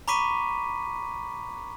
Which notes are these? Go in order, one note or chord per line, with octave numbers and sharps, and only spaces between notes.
A#5 B5 C#6 D6 B6 D#7